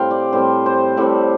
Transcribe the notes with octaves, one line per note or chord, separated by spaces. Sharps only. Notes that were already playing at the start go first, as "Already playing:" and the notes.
Already playing: A2 G3 C4 F5 G5
D5
A2 G3 C4 C5
C5
A2 G3 C4 D5